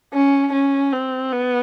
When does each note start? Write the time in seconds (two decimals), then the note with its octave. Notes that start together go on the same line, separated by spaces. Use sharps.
0.13 C#4
0.52 C#4
0.93 C4
1.32 B3